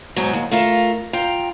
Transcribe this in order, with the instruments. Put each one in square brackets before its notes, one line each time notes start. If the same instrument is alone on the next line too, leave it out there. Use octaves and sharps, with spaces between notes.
[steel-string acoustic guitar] G#2 B2 F#3
D#2
A3 F4 A#4 E5
F4 G5 A#5